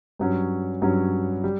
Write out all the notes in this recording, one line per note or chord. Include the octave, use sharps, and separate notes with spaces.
G2 F#3 C#4
G2 F#3 C#4
G3